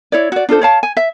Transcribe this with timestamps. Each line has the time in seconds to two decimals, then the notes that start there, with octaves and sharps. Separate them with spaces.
0.12 E4 C#5 D5
0.32 F#4 D5
0.49 D4 F4 A4 C5
0.61 C#5 F5 A5
0.83 G#5
0.97 E5